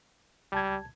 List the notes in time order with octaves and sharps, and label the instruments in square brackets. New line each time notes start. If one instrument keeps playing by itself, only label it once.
[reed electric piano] C#2 A5 G#6 [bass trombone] G3